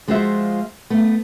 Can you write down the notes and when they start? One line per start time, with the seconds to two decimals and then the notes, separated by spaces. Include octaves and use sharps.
0.08 F3 G#3 F4 F#4 C5 E5
0.90 A3 B3